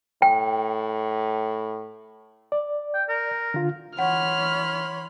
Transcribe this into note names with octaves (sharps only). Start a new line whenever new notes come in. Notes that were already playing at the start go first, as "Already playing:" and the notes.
A2 G5
D5
G5
A#4
D3 F4
E3 C#5 F#5 B5 C6 F6